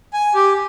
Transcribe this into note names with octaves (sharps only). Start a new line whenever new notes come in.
G#5
G4